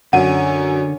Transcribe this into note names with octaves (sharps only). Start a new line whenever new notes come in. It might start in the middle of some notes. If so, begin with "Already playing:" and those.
F#2 D3 C#4 F#5 D#7